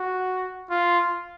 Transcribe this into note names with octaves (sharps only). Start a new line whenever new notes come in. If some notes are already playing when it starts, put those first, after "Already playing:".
Already playing: F#4
F4